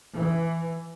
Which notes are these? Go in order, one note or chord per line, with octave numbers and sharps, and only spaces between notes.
E3